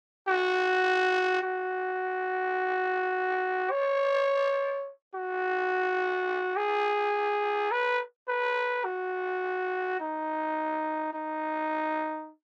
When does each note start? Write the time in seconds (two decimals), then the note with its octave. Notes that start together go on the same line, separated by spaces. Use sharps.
0.28 F#4
1.43 F#4
3.71 C#5
5.14 F#4
6.56 G#4
7.71 B4
8.28 B4
8.85 F#4
10.00 D#4
11.13 D#4